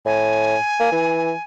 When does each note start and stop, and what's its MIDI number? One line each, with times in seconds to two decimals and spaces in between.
0.06 0.55 45
0.06 1.43 80
0.80 0.89 58
0.92 1.32 52